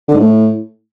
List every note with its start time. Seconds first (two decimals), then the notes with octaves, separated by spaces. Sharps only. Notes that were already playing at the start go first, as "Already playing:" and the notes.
0.08 D3
0.14 G#2
0.20 A2